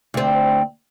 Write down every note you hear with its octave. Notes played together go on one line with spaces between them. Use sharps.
D2 C4